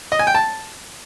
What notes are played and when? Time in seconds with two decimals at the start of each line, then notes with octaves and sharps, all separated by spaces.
0.12 D#5
0.19 G#5
0.27 G5
0.35 A5